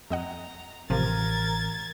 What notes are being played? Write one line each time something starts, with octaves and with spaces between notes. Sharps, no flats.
F2 D#5 F#5 A#5
A1 C3 F3 G4 A#4 G#6 A6